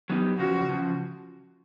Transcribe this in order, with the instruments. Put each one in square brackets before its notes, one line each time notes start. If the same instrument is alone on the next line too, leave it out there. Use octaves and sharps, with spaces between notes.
[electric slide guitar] F#3 B3 D#4 G4
[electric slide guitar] E2 C#3 F3 [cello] F#4
[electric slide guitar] C#3 F3